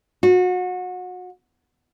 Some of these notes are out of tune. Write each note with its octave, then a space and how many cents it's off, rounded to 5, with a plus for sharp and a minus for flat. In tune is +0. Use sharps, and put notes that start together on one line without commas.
F#4 -30